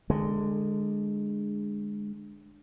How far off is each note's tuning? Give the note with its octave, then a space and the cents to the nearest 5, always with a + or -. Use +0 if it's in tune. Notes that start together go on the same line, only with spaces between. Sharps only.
D3 +15 G#3 -5